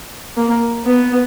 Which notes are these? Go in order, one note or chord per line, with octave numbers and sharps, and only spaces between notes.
A#3
B3